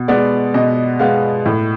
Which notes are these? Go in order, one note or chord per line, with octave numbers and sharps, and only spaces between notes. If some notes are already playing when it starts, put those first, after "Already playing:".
Already playing: B2
G#3 B3 D5
B2 D#5
G#3 B3 F5
A2